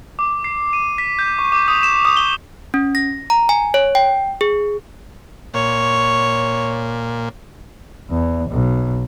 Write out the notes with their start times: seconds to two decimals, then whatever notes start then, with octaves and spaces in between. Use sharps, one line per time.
0.19 D6
0.44 C7
0.73 D#7
0.98 B6
1.19 G6
1.39 C#6
1.52 D6
1.68 D#6
1.83 E7
2.05 D#6
2.17 G7
2.74 C#4
2.95 A#6
3.30 A#5
3.49 G#5
3.74 C#5
3.95 G5
4.41 G#4
5.54 A#2 C#5
8.11 E2
8.51 B1